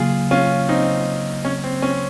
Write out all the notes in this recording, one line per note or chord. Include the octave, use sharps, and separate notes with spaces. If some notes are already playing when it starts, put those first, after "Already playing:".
Already playing: C#3 F#3 A#3 F4 G#4
C#4 F4
C4 D#4
C#4
C4
C#4